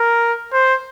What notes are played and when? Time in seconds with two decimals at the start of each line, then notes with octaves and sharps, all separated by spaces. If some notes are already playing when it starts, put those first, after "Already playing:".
Already playing: A#4
0.53 C5